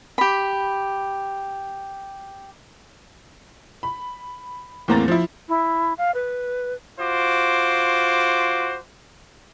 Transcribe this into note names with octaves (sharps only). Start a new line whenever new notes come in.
G4 B5
B5
E2 A2 A#3 C4 A#5 A6
F3 E4
E4
F5
B4
F4 F#4 C5 D6